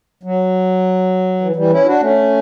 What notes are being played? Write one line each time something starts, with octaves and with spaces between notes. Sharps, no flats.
F#3
E3
E3 G3
C#4 E4
D4 F#4
A3 C#4